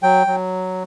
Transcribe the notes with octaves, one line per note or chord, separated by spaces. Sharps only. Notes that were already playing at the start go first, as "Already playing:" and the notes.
F#3 G5
F#3